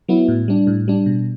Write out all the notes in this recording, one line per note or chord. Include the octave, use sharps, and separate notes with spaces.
F#3 B3 E4
A2
G3 D4
A2
G3 D4
B2